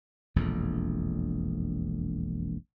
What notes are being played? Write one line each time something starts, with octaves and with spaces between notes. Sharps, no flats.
E1 A#1 F2